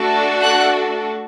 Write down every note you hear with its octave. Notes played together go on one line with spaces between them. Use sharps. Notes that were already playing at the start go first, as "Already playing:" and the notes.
Already playing: A3 D4 F#4 A4
F#5 F#6